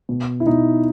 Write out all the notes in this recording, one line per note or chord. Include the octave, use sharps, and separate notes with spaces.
B2
E4
B2 D#4